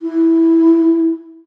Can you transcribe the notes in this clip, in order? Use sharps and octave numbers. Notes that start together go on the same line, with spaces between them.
E4